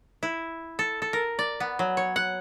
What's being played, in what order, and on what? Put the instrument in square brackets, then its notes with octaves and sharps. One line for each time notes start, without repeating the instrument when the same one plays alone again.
[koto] E4
A4
A4
A#4
D5
B3
F#3
C#5
F#5